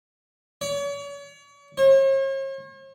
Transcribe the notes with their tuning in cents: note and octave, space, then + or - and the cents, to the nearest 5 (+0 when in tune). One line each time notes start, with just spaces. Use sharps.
C#5 +40
C#5 -45